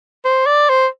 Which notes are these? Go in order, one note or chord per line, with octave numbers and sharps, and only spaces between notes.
C5
D5
C5